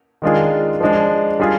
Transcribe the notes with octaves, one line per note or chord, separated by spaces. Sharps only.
D#3 G#3 D4 F4 G#4
F3 G#3 D4
G3 D4 F4 G#4